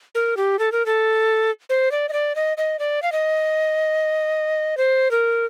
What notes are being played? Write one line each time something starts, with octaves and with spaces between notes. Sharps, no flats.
A#4
G4
A4
A#4
A4
C5
D5
D#5
D5
D#5
D#5
D5
F5
D#5
C5
A#4